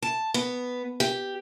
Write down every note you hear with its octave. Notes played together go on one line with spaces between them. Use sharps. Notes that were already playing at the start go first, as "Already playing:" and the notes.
A5
B3
G4